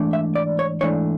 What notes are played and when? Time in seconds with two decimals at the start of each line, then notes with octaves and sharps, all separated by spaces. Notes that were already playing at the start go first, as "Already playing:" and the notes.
Already playing: G#2 E3 A3 D4
0.13 E5
0.35 D5
0.59 C#5
0.81 G#2 E3 A3 D4 C#5